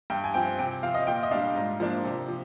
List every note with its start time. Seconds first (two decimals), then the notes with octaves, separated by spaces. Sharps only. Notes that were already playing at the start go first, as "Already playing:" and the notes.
0.10 G2 G5
0.24 G#5
0.34 F3 C4 G5
0.58 C3 G5
0.83 F3 C4 F5
0.94 D#5
1.07 A#2 G5
1.23 D#5
1.31 G3 D4 F5
1.56 G#2
1.80 F3 A#3 D4
2.04 C3
2.28 F3